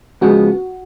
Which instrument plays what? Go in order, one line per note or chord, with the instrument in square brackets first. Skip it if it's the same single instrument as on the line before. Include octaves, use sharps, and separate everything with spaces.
[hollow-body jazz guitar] C#2 C#3 F3 G#3 B3 [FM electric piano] F#4